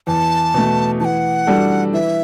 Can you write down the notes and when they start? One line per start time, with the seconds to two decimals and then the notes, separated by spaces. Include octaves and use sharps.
0.07 E2 A5
0.54 B2 A3
1.00 E3 A5
1.05 F#5
1.47 G3 D4 F#4 A4
1.93 E3 E5